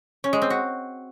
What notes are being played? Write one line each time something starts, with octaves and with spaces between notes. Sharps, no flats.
C#4
G#3
C4
F#4